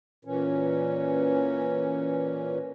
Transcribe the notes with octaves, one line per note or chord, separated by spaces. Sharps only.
A#2 E3 C#4